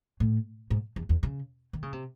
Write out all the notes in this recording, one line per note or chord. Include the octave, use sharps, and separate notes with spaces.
A2
G#2
E2
E2
C#3
D#3
C#3
C3